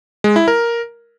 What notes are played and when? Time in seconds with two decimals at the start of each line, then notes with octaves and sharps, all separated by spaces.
0.24 G#3
0.36 E4
0.48 A#4